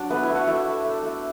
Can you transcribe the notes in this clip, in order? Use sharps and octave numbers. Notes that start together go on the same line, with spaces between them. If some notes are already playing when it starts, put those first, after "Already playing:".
Already playing: F#3 D4 D5
A3 B3 B4
E4 E5
A3
F#4 F#5
A3 E4 E5
A3
A3
A3